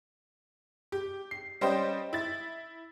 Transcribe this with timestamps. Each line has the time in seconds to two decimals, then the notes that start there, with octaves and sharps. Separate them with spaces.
0.92 G4
1.31 C7
1.61 G3 C#4 C5 D#5 G5
2.13 E4 A6